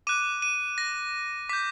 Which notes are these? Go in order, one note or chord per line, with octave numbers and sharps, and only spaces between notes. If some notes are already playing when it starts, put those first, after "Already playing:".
D6 F#6 D#7
D#7
A#6
D6 G6 B6